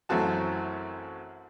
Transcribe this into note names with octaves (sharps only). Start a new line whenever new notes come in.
A1 F#2 A3 C4 F#4 A5